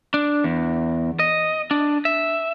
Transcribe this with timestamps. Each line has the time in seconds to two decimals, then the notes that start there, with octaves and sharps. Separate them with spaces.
0.14 D4
0.44 E2
1.19 D#5
1.71 D4
2.05 E5